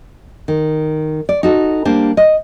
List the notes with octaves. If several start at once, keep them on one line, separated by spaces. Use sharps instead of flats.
D#3
D5
D#4 F#4 A4
G3 A#3 D4 C5
D#5